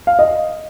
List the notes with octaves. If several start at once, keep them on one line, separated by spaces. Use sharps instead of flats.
F5
D#5